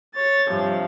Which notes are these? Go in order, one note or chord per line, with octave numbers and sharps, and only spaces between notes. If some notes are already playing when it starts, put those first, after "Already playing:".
C#5 A6
G2 C3 F3